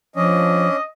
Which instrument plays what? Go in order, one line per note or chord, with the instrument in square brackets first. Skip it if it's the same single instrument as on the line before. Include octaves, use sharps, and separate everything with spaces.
[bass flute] F3 [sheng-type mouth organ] C#4 D4 [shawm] D#5